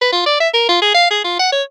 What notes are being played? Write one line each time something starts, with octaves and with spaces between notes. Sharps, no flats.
B4
F4
D5
E5
A#4
F4
G#4
F5
G#4
F4
F#5
C#5